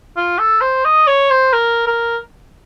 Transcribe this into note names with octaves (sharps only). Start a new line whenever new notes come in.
F4
A4
C5
D#5
C#5
C5
A#4
A#4